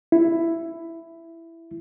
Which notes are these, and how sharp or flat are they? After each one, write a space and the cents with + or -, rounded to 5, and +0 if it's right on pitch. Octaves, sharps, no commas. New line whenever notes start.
E4 +10